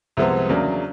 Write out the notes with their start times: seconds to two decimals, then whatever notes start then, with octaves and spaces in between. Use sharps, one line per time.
0.17 C2 C3 F3 G#3 B3
0.49 E2 C#3 F#3 A#3 D4